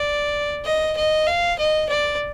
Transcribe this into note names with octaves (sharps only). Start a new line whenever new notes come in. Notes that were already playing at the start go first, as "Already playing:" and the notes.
Already playing: D5
D#5
D#5
F5
D#5
D5